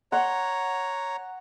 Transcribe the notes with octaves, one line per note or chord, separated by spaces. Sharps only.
C#5 F#5 A#5 C6